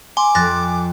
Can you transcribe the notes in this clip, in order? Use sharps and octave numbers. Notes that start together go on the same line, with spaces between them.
G#5 C6 D6
F2 F#6 A6 A#6